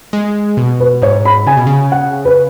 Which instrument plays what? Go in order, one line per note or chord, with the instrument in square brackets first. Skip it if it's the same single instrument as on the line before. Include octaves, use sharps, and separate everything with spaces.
[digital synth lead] G#3
B2
[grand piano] B4
[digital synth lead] G#2 [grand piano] C#5
[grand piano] B5
[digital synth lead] C#3 [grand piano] G#5
[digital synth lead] B2
C#3
[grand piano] F#5
B4